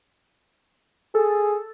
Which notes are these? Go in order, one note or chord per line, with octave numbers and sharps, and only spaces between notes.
G#4 A4